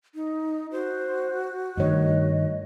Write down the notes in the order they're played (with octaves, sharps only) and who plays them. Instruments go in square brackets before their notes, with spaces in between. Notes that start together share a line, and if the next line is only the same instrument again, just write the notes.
[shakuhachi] D#4
[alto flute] F#4 [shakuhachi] C5
[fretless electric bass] G2 D#3 [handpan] A3 C#5 [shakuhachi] D#5